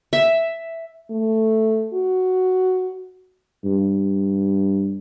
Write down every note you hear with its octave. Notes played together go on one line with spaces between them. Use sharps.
E5
A3
F#4
G2